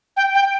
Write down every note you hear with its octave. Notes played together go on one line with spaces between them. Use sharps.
G5
G5